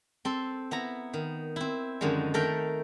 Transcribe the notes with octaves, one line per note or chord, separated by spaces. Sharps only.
C4 A4 C6
B3 E4 A#5
D#3
C4 E4
F#2 D3 D#3 F3 G#3
D#3 A3 A4 A#4 G5